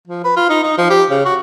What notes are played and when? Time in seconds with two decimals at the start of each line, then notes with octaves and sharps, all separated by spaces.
0.08 F3
0.25 B4
0.36 F4
0.49 D#4
0.63 D#4
0.78 F3
0.90 G4
1.10 C#3
1.25 F#4